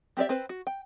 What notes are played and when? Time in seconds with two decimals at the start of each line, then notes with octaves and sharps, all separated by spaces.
0.17 C4 G4 B4 D5 E5
0.29 C4 B4 C5
0.49 F#4
0.67 G5